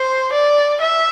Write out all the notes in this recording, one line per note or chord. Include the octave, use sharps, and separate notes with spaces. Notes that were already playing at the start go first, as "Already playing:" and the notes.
Already playing: C5
D5
E5